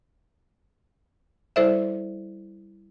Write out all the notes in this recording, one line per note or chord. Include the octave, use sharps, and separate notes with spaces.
G3 E4 A4 C5 D5 E5